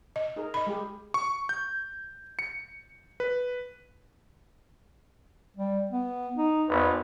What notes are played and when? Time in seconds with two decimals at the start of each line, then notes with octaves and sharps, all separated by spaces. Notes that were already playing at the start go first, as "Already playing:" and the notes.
0.16 D#5
0.36 D#4 G#4 A#4
0.54 D#5 B5
0.67 G#3 G4 G#4
1.14 C#6
1.49 G6
2.39 C#7
3.20 B4
5.57 G3
5.91 B3
6.36 D#4
6.69 G#1 E2 B4